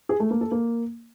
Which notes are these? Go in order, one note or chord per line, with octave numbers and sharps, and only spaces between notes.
G#4
A3
A#3
A4
A#3